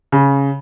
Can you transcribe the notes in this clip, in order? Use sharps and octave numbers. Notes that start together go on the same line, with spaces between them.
C#3